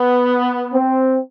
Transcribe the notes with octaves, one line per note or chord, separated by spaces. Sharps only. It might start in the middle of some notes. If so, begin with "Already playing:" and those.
Already playing: B3
C4